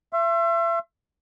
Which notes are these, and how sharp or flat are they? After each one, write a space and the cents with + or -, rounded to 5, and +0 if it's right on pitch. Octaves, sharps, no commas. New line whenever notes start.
E5 +35 C6 +35